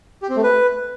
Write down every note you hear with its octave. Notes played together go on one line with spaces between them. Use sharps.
G4
C4
A3
B4